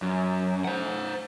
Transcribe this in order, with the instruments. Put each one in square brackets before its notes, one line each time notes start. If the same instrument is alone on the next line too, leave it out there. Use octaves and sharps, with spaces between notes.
[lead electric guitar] F#2
C5 F#5